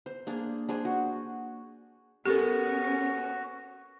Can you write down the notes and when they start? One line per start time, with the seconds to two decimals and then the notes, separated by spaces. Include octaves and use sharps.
0.06 C5
0.27 A#3 D4 G#4
0.68 D4 G#4 C5 G#5
0.85 F#4
2.26 B3 C#4 F#4 G4 A4 A#4